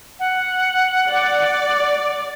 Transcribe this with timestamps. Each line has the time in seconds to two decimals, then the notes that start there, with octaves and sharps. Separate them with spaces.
0.19 F#5
1.09 D5